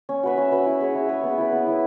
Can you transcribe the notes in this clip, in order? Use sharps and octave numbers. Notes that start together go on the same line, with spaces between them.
C#4
F#4 B4 E5
C#4
F#4 B4 E5
E4
G#4 C#5
E4
G#4 C#5
B3
E4 B4
B3
E4 B4